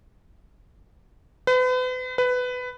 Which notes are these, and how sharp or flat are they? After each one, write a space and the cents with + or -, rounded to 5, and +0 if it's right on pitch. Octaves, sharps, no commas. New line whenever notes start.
B4 +40
B4 +15